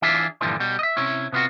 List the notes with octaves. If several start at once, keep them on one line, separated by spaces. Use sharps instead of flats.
E3 D4 F4 G#4 E5
G2 A#2 D3 E3 F3 G3
B2 G3
D#5 E5
C3 C#4 E4
C3 B3 F4 F#4